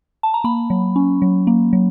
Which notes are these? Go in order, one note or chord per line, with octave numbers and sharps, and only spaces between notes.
A5
A#5
A#3 B5
F#3
C#4
F#3
A#3
F#3